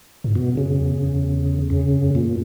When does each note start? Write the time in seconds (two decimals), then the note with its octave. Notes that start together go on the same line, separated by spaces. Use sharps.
0.24 G#2
0.35 F#2 B2
0.57 C#3
0.80 E2
1.70 F#2 C#3
2.15 A#2